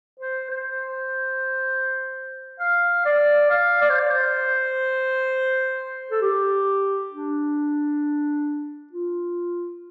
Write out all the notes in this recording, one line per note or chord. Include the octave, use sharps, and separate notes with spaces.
C5
C5
F5
D5
F5
D5
C5
D5
C5
A4
G4
D4
F4